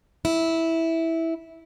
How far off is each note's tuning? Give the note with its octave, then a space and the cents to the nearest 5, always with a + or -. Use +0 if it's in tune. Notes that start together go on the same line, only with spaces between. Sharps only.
E4 -10